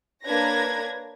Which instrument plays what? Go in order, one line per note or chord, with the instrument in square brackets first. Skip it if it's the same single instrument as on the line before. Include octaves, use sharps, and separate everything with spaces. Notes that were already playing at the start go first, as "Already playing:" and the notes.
[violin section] A#3 D4 B4 C#5 G#6 A#6